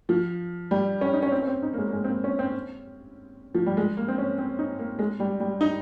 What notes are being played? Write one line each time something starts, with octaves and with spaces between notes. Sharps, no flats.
F3
G3
C#4
D#4
C#4
C4
C#4
C4
D#4
A#3
G#3
A#3
G#3
C4
A#3
C#4
C4
F3
G3
G#3
A#3
C4
C#4
C4
D#4
A#3
G#3
G3
G3
D#4